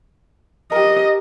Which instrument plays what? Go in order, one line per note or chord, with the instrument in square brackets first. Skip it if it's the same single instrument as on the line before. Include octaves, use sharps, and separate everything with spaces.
[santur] G4 A#4 [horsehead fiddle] D#5